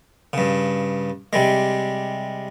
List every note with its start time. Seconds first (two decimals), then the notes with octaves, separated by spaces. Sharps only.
0.33 G2 C#3
1.33 C3 G3 G#3